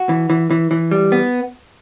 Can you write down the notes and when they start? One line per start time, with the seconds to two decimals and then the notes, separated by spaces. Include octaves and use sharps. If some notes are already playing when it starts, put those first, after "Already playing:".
Already playing: F#4
0.09 E3
0.30 E3
0.51 E3
0.71 E3
0.91 G3
1.12 B3